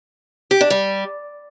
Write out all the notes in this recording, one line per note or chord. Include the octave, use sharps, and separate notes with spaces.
G4
D4
G3